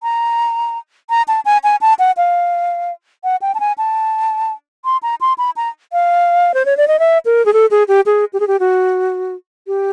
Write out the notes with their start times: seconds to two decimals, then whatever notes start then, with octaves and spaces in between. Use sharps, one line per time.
0.03 A#5
1.10 A#5
1.28 A5
1.45 G#5
1.64 G#5
1.81 A5
1.99 F#5
2.17 F5
3.24 F#5
3.42 G5
3.55 A5
3.60 G#5
3.78 A5
4.85 C6
5.03 A#5
5.21 C6
5.38 B5
5.56 A#5
5.92 F5
6.54 C5
6.65 C#5
6.77 D5
6.88 D#5
6.99 E5
7.25 A#4
7.46 G#4
7.53 A4
7.71 G#4
7.88 G4
8.06 G#4
8.33 G4
8.40 G#4
8.48 G4
8.60 F#4
9.67 G4